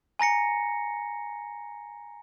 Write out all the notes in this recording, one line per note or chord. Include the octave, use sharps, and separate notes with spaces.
G#5 A#5 A#6 C#7